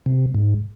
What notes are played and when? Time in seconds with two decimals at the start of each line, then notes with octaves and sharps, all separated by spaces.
0.06 C3
0.35 G#2